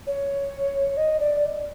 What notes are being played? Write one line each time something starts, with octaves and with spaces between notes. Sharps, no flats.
C#5
D#5
D5